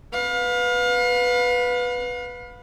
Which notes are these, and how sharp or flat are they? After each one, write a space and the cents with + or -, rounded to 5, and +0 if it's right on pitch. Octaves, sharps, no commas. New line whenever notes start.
B4 +0 F5 +35